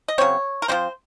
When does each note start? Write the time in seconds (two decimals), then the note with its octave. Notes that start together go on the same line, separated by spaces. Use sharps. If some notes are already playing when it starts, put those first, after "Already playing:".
0.08 D#5
0.18 C#3 F#3 C4 C#5
0.62 A#4
0.68 F3 G#3 C4 C5